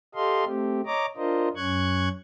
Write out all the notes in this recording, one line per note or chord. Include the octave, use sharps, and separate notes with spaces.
G4 A4 D#5 F5 C6
A3 C4 G4
C#5 D#5 A#5 D6
D4 F4 A#4 C5 D#5
F#2 C#4 C#6 F#6 G#6